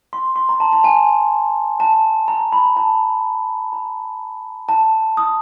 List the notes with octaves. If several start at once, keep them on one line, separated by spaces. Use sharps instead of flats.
C6
C6
A#5
A5
A5
G#5
A5
A#5
B5
A5
A#5
A5
D#6